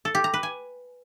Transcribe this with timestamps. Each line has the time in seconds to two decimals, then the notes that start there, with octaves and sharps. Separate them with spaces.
0.05 A4
0.15 G4
0.24 A#5
0.34 B4
0.43 G#5